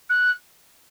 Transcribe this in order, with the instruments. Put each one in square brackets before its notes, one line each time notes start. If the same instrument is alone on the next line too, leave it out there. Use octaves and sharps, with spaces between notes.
[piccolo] F#6